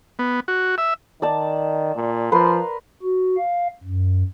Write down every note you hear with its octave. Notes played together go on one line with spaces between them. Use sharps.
B3
F#4
E5
D#3 D5 A5
A#2
F3 A#4 B4 C6
F#4
F5
F#2